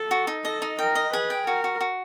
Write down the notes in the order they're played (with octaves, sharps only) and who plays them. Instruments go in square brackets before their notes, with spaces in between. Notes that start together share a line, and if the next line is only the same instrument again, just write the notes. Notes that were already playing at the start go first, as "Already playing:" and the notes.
Already playing: [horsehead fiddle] A4
[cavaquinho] F#4
D#4
[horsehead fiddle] A4 [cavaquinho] D#5
[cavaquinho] D#4
[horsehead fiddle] A#4 [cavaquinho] G5
[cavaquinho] D#5
[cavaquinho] G#4 [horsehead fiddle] B4
[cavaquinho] G5
[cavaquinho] F#4 [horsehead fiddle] A#4
[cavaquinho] F#4
F#4